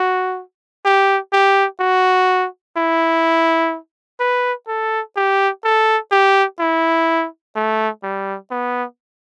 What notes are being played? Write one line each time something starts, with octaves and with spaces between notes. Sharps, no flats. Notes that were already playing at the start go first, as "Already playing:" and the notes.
Already playing: F#4
G4
G4
F#4
E4
B4
A4
G4
A4
G4
E4
A3
G3
B3